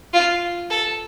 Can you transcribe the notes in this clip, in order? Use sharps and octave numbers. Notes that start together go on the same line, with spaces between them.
F4
A4